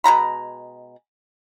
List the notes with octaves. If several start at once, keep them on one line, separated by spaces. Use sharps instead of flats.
B2 G#3 A#5 B5